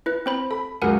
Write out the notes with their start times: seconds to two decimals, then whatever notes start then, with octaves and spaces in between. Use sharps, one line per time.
0.06 E4 B4
0.26 C4 C5 B5
0.51 A4 B5
0.82 C#2 F#2 A#4 F#5 G#5